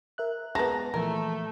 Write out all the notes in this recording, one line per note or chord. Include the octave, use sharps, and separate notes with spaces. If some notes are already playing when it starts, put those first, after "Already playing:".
A#4 E5 F#6
G#3 B3 A5 A#5 A#6
A#2 E3 F3 A3 A#4